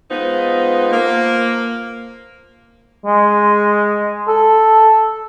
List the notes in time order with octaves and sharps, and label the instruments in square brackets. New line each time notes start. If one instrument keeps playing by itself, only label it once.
[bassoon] F3 [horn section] G#3 B3 D#4
[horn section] A#3
[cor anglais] G#3
A4